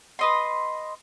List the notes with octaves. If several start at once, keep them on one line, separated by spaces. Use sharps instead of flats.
B4 D#5 C6